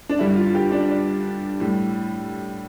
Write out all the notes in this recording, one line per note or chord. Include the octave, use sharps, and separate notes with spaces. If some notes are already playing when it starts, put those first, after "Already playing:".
D4
G2 D3 G3 E4
F4
G4
D4
D4
A2 G3